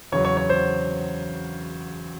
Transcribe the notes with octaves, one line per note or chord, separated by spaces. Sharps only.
E2 C#3 F#3 C#5
C#5
C#5
C5